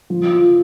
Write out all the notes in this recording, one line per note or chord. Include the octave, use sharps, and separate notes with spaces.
F3
F4